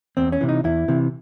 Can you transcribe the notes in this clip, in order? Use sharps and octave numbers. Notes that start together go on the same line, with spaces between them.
E2 C4
C#4
C3 E3
D#4
E2 E4
C3 E3